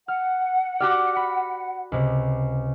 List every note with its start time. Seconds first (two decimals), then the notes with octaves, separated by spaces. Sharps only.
0.08 F#5 F6
0.80 F#4 G4 D5 F6
1.16 B5
1.92 C#2 C3